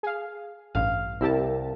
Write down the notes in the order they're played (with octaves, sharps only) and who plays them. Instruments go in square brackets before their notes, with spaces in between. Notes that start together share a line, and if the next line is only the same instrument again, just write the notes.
[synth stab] G#4 F5
[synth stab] A1 G2 [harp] F5
[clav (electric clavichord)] C2 [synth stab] E4 G4 A5 [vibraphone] A#4